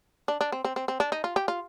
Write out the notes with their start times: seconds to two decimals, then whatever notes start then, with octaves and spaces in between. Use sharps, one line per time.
0.28 D4
0.41 D4
0.52 C4
0.65 C4
0.76 C4
0.88 C4
1.00 D4
1.12 D#4
1.24 F4
1.36 G4
1.48 F4